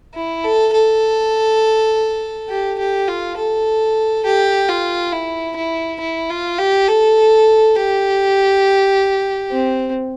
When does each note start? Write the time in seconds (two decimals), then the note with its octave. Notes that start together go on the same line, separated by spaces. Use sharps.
0.14 E4
0.44 A4
0.73 A4
2.49 G4
2.78 G4
3.07 F4
3.37 A4
4.25 G4
4.68 F4
5.12 E4
5.56 E4
6.00 E4
6.29 F4
6.58 G4
6.88 A4
7.76 G4
9.51 C4